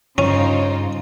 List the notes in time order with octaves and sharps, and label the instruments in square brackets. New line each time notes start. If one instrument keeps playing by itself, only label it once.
[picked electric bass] G2 [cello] C#3 [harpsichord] C#4 [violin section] D#4 F4 C5